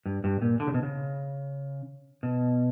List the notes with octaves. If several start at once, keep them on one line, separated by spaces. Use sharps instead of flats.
G2
G2
A#2
D3
C#3
B2
C#3
B2